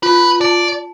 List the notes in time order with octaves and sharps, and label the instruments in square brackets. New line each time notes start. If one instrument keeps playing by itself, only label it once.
[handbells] F4 [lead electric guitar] B4
[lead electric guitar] D5 [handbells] A5